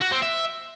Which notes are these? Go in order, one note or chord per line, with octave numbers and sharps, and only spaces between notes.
F#4
C4
E5